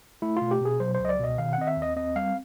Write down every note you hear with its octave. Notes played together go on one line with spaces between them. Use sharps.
A3 E4
B2 F4
G4
B2 G#4
F#3 C5
C#2 C5
D#5
D5
B2 D#5
D#3 F5
F#5
C4 D#5
E5
D#2
D#5
C4 D#5
G3 F5